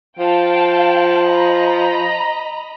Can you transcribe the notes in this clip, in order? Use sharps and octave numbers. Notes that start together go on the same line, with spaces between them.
F3 F5 G5 A5
D#5 A#5 B5